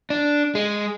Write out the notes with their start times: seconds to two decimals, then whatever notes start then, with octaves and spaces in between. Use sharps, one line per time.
0.10 D4
0.55 G#3